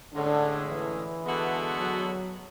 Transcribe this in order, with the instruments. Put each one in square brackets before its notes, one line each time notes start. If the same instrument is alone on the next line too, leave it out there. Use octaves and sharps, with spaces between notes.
[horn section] A2 G#3 C#4 E4 G#4 [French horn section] D3
[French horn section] E3
[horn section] D3 G#3 B3 F#4 A4
[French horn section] F#3